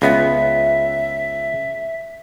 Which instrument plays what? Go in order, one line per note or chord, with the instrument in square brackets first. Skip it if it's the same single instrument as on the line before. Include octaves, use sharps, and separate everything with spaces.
[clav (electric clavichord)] C#2 B3 [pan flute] E5